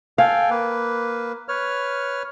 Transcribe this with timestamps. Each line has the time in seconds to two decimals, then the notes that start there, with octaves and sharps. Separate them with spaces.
0.18 A4 F5 G5 G#5
0.50 A#3 B4
1.48 B4 C#5 F6